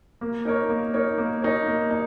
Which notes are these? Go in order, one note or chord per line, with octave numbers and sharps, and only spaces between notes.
A#3
D#4 A#4 C#5
A#3
D#4 A#4 C#5
A#3
D#4 A#4 C#5
A#3
D#4